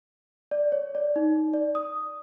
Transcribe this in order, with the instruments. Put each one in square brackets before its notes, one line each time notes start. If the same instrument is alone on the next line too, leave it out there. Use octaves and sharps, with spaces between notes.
[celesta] D5
C#5
D5
D#4
D5
D#6